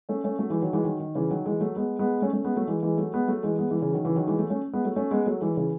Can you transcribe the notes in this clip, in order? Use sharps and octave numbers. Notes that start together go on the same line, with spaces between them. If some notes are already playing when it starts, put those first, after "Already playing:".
A3 C#4
A3 C#4
F#3 A3
E3 G#3
D#3 F#3
E3 G#3
D#3 F#3
D#3
C#3 E3
D#3 F#3
E3 G#3
F#3 A3
G#3 B3
G#3 B3
A3 C#4
A3 C#4
G#3 B3
F#3 A3
E3 G#3
E3 G#3
F#3 A3
G#3 B3
F#3 A3
E3 G#3
G#3 B3
E3 G#3
C#3 E3
D#3 F#3
C#3 E3
D#3 F#3
E3 G#3
F#3 A3
A3 C#4
G#3 B3
F#3 A3
A3 C#4
G#3 B3
F#3 A3
E3 G#3
C#3 E3